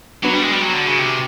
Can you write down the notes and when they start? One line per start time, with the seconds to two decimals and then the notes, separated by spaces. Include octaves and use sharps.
0.24 F#3 B3 D4 F#4 B4
0.33 G3
0.43 G#3
0.52 G3
0.62 F#3
0.74 D3
0.86 C#3
0.99 C3